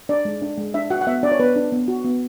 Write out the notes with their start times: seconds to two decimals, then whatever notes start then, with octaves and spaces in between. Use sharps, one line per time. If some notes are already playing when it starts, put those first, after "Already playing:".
0.09 D4 D5
0.25 G#3
0.42 D4
0.58 G#3
0.74 D4 E5
0.90 F#4 F#5
1.01 F#5
1.07 B3 E5
1.23 D4 D5
1.32 C#5
1.39 B3 B4
1.56 D4
1.72 B3
1.88 F#4
2.04 B3